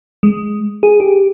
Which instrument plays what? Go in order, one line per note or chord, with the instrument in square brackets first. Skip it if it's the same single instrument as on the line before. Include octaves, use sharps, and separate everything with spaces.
[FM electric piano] G#3
G#4
G4